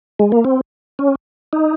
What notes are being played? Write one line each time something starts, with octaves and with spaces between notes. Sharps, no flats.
G#3
A#3
C4
C#4
D#4